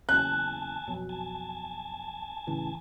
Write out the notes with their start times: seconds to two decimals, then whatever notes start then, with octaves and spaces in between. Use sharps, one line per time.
0.09 F#1 E2 C#4 G#5 A5 F#6
0.87 F2 B2 F#3
1.09 G#5 A5
2.47 A2 C#3 E3